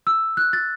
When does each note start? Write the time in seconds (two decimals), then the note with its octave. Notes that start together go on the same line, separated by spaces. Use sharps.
0.07 E6
0.37 F#6
0.53 A6